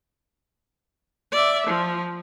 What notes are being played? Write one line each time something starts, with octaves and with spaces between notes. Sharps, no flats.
D5 E5
F3